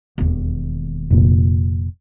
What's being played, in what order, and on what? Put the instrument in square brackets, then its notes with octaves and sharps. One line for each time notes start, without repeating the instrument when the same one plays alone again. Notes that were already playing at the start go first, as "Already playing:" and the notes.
[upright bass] E1 D#2
[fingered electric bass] F1 A#2